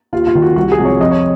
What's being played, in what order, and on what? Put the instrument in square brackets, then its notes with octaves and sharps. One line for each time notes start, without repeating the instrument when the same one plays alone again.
[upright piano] D#2 F4
F4
D#3 A#3
F#4
C2 F#4
G#4
C3 F3 G#3
C#5
F2 D#5
C#5